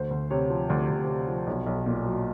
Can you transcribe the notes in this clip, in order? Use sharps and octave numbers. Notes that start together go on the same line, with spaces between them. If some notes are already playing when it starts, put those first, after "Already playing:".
Already playing: D2 C5
D2
C3 C#5
F3
D2 D5
D2
C3
F3
B1
B1
A#2
F#3